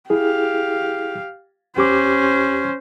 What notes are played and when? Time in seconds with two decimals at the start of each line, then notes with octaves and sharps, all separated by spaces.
0.10 E4 G4 G#4 F5
1.76 E2 C#4 G4 C5 D6